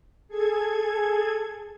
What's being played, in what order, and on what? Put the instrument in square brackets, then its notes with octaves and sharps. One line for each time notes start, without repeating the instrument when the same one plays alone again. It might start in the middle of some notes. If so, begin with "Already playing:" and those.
[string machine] G#4 A4 G#6